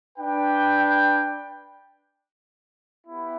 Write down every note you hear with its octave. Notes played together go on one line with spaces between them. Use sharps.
D4 B4 G5
B3 E4 G4